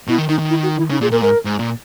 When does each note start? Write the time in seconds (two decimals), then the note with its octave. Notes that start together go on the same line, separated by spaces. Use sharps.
0.08 B2 E4
0.18 D#3
0.29 D#3 D#4
0.39 D#3
0.49 E4
0.62 F#4
0.77 E4
0.90 C#3 D#4
1.01 A#2 G#4
1.11 A#2 A#4
1.21 G#2 A#4
1.45 G#2
1.59 A#2